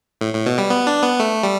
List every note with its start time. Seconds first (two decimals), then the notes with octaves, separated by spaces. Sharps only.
0.21 A2
0.34 A2
0.46 B2
0.58 G3
0.70 B3
0.87 D4
1.03 B3
1.20 A3
1.43 G3